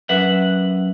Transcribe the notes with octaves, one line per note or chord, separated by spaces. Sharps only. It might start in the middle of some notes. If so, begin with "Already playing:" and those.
F#2 A#4 B4 E5 F#5